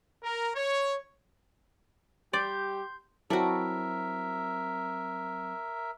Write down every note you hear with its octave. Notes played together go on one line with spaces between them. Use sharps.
A#4
C#5
G3 G4 D5 C6 G6
F#3 C4 E4 F#4 A4 A#4 D5 E5